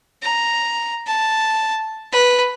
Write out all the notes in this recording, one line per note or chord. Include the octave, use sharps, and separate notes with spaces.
A#5
A5
B4